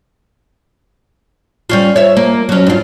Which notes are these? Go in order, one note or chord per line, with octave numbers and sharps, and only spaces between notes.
G3 C#4 F4
C#5 E5
A#3
F#3 C#4
G2 F4